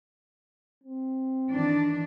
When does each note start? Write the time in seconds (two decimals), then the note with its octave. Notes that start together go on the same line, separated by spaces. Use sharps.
0.84 C4
1.52 D#3 E3 D4